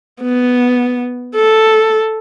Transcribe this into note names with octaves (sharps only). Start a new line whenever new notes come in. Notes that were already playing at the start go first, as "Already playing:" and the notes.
B3
A4